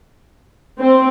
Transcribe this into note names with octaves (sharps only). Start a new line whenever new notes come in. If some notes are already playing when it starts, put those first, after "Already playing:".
C4